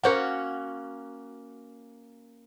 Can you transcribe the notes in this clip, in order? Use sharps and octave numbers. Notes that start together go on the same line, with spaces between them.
A#3 C#4 F#4 A#4 C5 F#5